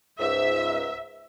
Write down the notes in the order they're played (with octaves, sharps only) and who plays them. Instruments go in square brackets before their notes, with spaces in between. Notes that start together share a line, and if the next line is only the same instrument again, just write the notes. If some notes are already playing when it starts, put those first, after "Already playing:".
[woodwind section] C#2 G#2 [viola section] E5